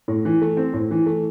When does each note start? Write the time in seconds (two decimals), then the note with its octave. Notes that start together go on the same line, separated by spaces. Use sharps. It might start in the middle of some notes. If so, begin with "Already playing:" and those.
0.08 A2
0.25 E3
0.42 A3
0.57 C4
0.73 A2
0.91 E3
1.06 A3